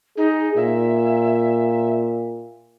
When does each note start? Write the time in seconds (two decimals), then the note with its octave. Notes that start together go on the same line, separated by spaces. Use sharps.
0.17 D#4 G#4
0.56 A#2 E5